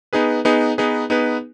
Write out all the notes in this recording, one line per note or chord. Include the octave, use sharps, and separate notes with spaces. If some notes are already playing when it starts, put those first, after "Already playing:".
B3 D#4 G#4 B4
B3 D#4 G#4 B4
B3 D#4 G#4 B4
B3 D#4 G#4 B4